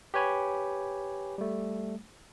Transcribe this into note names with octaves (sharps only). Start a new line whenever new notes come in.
G4 B4 C#5 G#5 B5
G3 A3